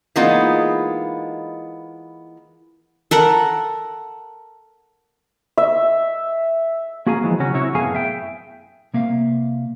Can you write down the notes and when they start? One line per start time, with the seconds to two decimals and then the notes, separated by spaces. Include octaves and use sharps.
0.16 E3 G#3 A#3 B3 D#4 F4
3.11 A4 A#4 F#5
5.57 E5
7.07 A#3 F#4 G#4 F5 G#5 A#5
7.23 E3 F3 G#3
7.40 C#3 F#3 C#4 F#4
7.54 C3 E4 F#4 C#5
7.75 F#2 A2 B3 G#4 F5 G#5
7.95 E5 G5
8.94 C3 A#3 E5 F5